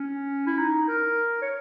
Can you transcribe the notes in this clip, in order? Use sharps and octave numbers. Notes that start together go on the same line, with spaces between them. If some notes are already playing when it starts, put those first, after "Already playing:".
Already playing: C#4
E4
D#4
A#4
C#5